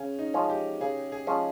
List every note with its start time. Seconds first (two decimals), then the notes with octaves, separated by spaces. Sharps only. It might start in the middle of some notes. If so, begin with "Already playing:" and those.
Already playing: C#3 C#4
0.19 D#4
0.34 F3 G#3 C#4
0.50 G4
0.81 C#3 G#4
1.12 G#4
1.27 F3 G#3 C#4